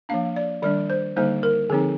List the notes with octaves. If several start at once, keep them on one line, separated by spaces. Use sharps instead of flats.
F3 A#3 D4 F5
D5
D#3 G3 D4 D5
C5
D3 G3 A#3 D#4 C5
A#4
D3 F3 C4 D#4 G#4